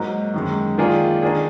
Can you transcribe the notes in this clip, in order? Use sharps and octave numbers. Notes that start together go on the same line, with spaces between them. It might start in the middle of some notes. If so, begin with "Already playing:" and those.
Already playing: G#2 F#3 A#3 D#4
F#2 D#3 G#3
D#3 A#3 F4 G#4 D5
D#3 A#3 D4 G#4